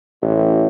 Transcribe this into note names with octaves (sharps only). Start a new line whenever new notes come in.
A1